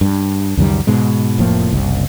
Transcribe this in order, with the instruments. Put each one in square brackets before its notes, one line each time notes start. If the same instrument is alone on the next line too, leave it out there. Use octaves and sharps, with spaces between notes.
[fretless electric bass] G2
C#2 F#2 D#3 G3
G#2 B2 G#3
F1 A2 F3 A#3
F#1 C2